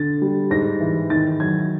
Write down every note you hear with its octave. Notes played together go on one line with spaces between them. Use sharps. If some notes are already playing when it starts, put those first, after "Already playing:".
Already playing: D3 A6
G3
G#2 A#6
E3
D#3 A6
F#3 G#6